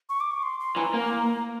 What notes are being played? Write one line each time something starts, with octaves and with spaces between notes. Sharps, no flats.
C#6
D6
C#6
C6
C6
E3 A#5
A#3